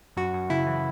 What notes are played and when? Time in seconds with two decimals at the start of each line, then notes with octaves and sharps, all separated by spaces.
0.16 F#2 F#4
0.33 F#2
0.50 C#3 E4
0.67 E3